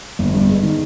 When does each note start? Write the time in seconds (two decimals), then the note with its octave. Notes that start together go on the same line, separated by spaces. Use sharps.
0.19 G1
0.34 G2
0.49 G#3
0.63 D#3